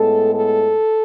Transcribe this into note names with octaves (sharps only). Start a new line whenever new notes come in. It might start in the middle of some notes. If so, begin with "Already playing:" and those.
Already playing: A2 G#3 B3 A4
A4